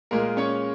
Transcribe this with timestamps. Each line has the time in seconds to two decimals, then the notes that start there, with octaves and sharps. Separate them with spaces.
0.11 A#2 G#3 A#3 A#4
0.37 C#4 C#5